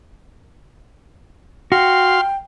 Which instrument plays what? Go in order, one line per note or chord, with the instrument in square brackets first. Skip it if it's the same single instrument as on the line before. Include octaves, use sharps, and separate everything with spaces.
[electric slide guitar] F#4 [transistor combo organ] F5 C6 [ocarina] G5